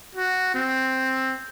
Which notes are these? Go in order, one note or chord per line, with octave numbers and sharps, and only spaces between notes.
F#4
C4